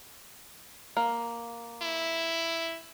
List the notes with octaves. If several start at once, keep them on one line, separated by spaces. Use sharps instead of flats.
A#3
E4